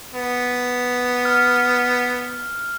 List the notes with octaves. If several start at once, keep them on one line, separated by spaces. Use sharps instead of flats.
B3
F6